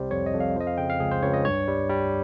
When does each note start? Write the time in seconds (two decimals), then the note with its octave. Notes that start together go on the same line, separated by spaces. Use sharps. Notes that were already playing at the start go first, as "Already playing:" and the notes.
Already playing: C2 C3 G3 C5
0.11 F2 C#5
0.26 D#5
0.34 F2
0.40 F5
0.56 F3 D#5
0.67 F5
0.78 C#3 G5
0.90 F5
1.00 C#2 G#4
1.11 C5
1.23 C#2 C#5
1.34 D#5
1.45 G2 C#5
1.68 G3
1.90 G3